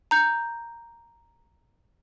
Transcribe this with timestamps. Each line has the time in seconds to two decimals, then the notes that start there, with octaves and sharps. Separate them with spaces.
0.11 A#5 G6